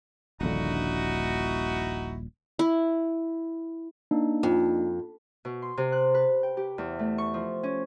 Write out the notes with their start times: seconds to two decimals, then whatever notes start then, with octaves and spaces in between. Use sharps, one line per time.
0.41 D#1 A#1 D3 D#4 E4 F#4
2.59 E4
4.11 A#3 D4 D#4
4.43 F2
5.45 B2
5.62 C6
5.77 C3
5.92 F#6
6.14 B4
6.43 G5
6.57 G4
6.78 E2
6.99 A3
7.18 C#6
7.34 F3
7.63 C#4